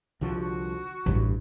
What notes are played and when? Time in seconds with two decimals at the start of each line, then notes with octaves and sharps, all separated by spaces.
0.21 C2 D3 F3 F#4
0.40 F#4
1.06 A1 G2